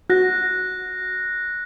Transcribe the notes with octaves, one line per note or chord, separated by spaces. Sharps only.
F#4 F#6 A#6